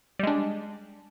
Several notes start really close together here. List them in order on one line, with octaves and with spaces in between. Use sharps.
G3 G#3 D4